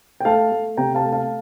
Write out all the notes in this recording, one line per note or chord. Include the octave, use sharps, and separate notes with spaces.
G5
A3 F5 A5
A3
C3 G5 A#5
F5 A5
A3
F5 A5